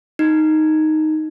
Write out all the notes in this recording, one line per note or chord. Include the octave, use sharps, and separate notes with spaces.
D#4